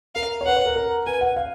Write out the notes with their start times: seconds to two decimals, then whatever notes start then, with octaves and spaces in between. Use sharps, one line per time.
0.15 A#4 F5
0.41 C#5
0.46 B4 F#5
0.56 C#5
0.66 A#4
0.76 A#4
1.06 B4 G#5
1.21 F#5
1.36 F5